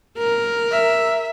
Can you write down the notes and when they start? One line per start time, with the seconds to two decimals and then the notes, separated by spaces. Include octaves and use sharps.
0.18 A#4
0.72 E5